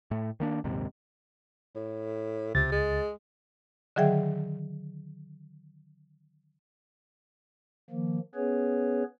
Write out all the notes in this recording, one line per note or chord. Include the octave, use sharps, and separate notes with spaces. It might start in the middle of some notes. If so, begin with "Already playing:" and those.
A2 A3
D#3 A#3 D4
A#1 D#2 G#2 C3
A2
C#2 C3 A6
G#3
D3 D#3 F#3 G#4 E5 G5
D#3 F3 A#3
B3 C#4 G#4 B4 C#5